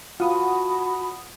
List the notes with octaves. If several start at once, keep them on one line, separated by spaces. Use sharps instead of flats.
F4 F#4 F#5 A5 B5 D#6